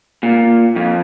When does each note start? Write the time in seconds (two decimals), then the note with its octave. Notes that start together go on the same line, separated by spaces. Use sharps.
0.23 A#2
0.76 F2